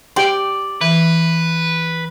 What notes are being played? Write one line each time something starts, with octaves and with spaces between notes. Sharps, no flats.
G4 D5 G5 C6
E3 B4